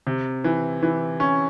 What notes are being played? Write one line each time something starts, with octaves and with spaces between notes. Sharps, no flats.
C3
E3
E3
C#4